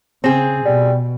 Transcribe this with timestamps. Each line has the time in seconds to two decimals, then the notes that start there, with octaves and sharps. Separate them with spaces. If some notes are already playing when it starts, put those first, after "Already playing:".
0.24 C#3 C4 G#4
0.65 B2 G3